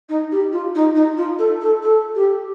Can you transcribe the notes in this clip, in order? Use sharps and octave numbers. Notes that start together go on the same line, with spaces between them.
D#4
G4
F4
D#4
D#4
F4
A4
A4
A4
G4